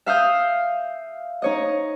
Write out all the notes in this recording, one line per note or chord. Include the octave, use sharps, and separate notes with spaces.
E5 F5 D#6 G6
D#4 C#5 D#5